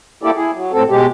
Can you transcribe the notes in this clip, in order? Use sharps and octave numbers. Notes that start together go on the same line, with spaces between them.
A#3 E4 G4 A4 D5
E4 G#4
F#3
A2 C4 A4
B2 G#3 G4